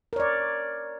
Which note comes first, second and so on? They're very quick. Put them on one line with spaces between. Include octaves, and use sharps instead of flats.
A#4 C#5 D5